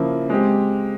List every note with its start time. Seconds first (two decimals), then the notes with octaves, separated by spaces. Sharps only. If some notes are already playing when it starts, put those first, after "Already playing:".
Already playing: C#3 F3 A#3 E4
0.30 G#3 C4 G4